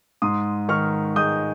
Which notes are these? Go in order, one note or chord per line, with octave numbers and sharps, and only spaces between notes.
G#2 C6 D#6
D#3 C#6 F6
G#3 D#6 G6